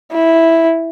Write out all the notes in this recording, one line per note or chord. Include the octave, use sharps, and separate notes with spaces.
E4